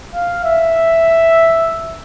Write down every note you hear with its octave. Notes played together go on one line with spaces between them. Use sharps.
F5
E5